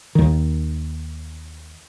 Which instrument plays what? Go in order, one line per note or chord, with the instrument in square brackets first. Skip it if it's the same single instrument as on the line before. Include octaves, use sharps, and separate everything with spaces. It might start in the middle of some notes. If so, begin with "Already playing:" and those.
[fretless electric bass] D#2 D#3